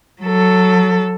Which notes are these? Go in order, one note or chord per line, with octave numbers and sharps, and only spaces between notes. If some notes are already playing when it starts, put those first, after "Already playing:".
F#3 A4